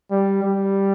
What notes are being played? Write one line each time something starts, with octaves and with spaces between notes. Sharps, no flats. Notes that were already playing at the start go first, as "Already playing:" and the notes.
G3
G3